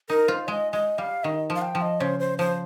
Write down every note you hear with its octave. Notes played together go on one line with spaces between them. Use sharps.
D#4 A#4
F4 C5
G#3 D#5
G#3 D#5
G3 F5
D#3 D#5
F3
F5
G5
F3
D#5
C#3 C5
C5
F3 C5